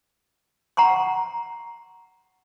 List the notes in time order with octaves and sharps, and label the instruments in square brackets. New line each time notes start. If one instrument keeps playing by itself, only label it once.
[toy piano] F#5 A#5 C6 C#6